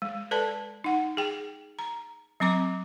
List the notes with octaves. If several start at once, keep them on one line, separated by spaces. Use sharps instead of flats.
G#3
A4 B4 D5 A5
D#4 F#5
G#4 G5
A#5
F#3 C4 A#5 D6